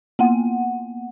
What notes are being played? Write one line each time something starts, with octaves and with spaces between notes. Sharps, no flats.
A#3 B3 F#5